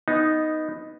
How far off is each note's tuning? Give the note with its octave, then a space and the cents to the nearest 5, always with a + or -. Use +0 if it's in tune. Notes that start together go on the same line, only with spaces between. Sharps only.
B3 +0 D#4 +0